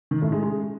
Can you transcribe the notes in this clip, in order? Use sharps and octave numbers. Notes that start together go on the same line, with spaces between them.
D#3
A2
G#3
G#3